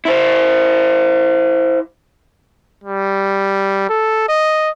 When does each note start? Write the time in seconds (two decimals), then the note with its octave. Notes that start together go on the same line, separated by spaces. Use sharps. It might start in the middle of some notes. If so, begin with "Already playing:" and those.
0.05 E4 C5
2.84 G3
3.89 A4
4.29 D#5